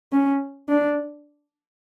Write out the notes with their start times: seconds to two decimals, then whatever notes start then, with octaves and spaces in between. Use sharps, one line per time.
0.12 C#4
0.69 D4